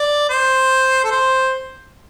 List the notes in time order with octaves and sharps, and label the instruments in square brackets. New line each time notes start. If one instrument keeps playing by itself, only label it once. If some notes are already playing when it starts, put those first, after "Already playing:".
Already playing: [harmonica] D5
C5
A4
C5